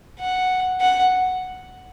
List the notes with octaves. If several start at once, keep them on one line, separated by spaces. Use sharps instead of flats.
F#5
F#5